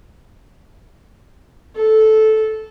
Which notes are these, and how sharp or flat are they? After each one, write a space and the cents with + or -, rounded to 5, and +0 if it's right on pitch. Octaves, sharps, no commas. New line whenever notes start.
A4 -10